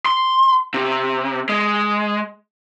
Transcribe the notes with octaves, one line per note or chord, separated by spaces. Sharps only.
C6
C3
G#3